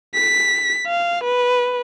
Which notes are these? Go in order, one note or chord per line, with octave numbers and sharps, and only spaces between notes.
B6
F5
B4